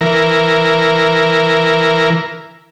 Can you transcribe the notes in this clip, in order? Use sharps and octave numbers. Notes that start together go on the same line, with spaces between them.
E3 A#4